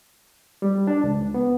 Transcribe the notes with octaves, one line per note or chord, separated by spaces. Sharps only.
G3
D4
C#2
B3